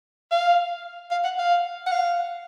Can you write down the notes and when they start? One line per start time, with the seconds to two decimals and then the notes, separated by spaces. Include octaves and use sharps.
0.31 F5
1.11 F5
1.24 F#5
1.39 F5
1.86 F#5
1.91 F5